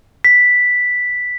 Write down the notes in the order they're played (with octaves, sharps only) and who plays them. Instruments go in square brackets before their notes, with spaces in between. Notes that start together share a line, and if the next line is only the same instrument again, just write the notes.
[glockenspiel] B6